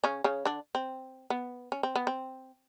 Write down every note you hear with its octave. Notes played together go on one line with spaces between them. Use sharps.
C#3 C#4
C#3 C#4
D3 D4
C4
B3
C#4
C4
B3
C4